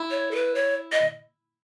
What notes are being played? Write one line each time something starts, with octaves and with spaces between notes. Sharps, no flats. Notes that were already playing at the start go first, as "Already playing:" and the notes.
Already playing: E4
C#5
A4
B4
C#5
D#5